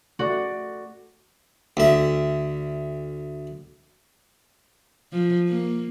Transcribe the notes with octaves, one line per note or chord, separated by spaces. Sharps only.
A3 F#4 D5
D2 E5
F3
A#3